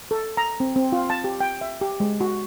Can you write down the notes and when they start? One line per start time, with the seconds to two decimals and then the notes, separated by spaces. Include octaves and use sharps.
0.11 A4
0.37 A#5
0.60 C4
0.76 C4
0.92 F4
1.10 A5
1.24 G4
1.40 G5
1.61 E5
1.81 G4
2.00 G#3
2.21 F#4